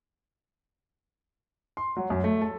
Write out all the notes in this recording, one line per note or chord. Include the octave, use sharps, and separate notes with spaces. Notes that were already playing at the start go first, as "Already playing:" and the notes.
C6
F#3
F#2
A3
A4